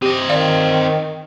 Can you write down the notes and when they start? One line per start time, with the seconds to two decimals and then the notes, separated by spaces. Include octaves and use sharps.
0.02 C4 G4 D#5
0.29 D#3 D5 F5